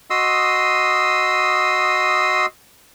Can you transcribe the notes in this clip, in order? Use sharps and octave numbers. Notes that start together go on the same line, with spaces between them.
F#4 D#5 C6 D#6 E6